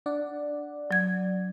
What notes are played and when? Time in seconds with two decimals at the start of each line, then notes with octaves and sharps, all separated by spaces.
0.06 D4 D5 F#5
0.91 F#3 G#6